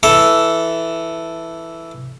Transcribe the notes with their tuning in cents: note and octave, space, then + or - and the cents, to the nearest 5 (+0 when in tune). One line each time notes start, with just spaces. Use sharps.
E3 +0 A4 +0